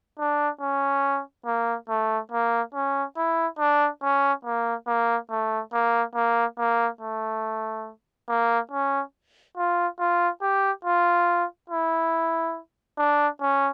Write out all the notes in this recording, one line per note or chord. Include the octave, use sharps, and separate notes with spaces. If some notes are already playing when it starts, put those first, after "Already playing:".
D4
C#4
A#3
A3
A#3
C#4
E4
D4
C#4
A#3
A#3
A3
A#3
A#3
A#3
A3
A#3
C#4
F4
F4
G4
F4
E4
D4
C#4